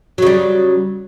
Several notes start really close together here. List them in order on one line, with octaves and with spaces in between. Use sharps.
F#3 C#3 G3